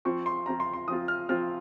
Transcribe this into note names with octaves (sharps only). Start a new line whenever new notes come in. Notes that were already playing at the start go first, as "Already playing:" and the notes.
F3 C4 F4 C#6
C6
F3 C4 F4 A#5
C6
C6
F3 C4 F4 D#6
F6
F3 C4 F4 F6